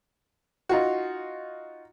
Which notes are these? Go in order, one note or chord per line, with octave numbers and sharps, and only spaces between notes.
D#4 F4 F#4